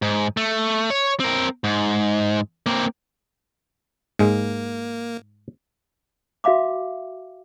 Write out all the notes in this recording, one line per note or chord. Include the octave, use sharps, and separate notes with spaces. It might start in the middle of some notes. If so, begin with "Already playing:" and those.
G#2
A3
C#5
C4 A#4
G#2
A#3 C4
G#2 G#3 A#3
F#4 E5 F5 B5 D6